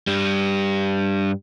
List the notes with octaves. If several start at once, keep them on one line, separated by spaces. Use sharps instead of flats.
G2 G3